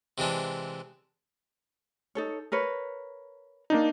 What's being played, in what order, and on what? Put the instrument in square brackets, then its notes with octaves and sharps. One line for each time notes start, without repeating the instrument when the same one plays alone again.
[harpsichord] C3 E3 G#3 D4
[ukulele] D#4 A4 C#5
A#4 B4 C#5
[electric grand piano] A#3 D4 D#4